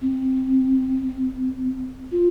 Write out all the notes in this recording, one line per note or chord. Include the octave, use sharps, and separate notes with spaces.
C4
F4